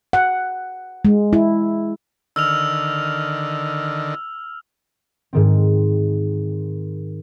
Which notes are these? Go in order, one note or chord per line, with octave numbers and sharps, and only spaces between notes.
F#5
G#3
E4
D3 D#3 E6 F6 F7
G#2 D#3 C4